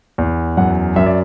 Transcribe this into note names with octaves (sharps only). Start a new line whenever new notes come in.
E2
F#2 F#5
F#2 E5
D5